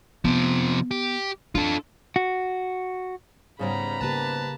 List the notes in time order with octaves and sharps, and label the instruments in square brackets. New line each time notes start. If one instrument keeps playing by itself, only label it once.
[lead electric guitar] C3 F3 [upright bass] B3
[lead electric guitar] G4
[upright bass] D4 [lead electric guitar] F4 A4
[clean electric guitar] F#4
[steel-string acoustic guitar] G#2 G3 B3 [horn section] C#3 [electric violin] A#5 B5
[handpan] C#3 A#3 G4 [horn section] B4 A5